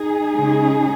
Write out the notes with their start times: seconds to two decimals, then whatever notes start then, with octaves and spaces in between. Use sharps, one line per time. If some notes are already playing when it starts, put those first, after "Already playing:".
Already playing: D#4 G#4
0.34 C#3 G#3 C#4